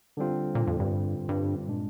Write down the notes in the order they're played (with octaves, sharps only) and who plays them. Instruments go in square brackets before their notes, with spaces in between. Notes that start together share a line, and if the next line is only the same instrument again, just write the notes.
[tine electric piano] D3 G3 C4 F4
[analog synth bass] A#2
F2
G2
G2
[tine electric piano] A#2 G#3 D4